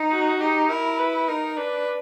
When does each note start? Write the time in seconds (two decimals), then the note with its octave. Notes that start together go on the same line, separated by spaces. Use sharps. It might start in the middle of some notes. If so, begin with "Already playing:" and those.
Already playing: D#4
0.11 F#4
0.40 D#4 G4
0.69 E4 A#4
0.99 B4
1.28 D#4 A#4
1.57 D4 B4